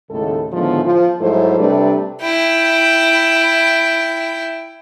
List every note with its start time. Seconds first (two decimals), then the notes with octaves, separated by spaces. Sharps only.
0.10 D#2 A2 C#3 G#3 A4
0.52 A2 D3 D#3 F3 G#3 B3
0.83 F3
1.20 G#2 F#3 A3 E4 A4 C5
1.58 C3 G3 A3 D4 A4 B4
2.22 E4 G5